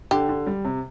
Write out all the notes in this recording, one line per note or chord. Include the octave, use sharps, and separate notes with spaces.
D3 G4
D3
G3
C3